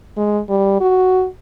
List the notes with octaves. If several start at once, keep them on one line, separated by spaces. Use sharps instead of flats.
G#3
G3
F#4